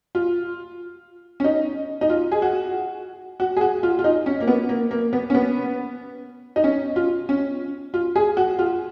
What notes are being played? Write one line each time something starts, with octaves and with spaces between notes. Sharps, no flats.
F4
C#4
D#4
D#4
F4
G#4
F#4
F#4
G#4
F#4
F4
F4
D#4
C#4
A#3
B3
A#3
A#3
B3
C#4
B3
D#4
C#4
F4
C#4
F4
G#4
F#4
F4